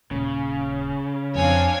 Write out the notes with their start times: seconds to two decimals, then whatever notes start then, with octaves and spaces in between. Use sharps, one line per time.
0.11 D#1 C#3
1.35 F2 C4 D4 C#5 F5 G#5